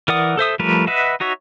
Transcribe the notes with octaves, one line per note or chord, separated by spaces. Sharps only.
E3 A#4 D5 F#5 D#6
A4 C5 E5 D#6
F3 G3 A3 A#4 B4
B4 D#5 E5 F#5
D#4 F#4 C#5 E5